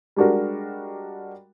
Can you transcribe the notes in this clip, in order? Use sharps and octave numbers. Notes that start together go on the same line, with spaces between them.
G3 G#3 D4 F#4 A#4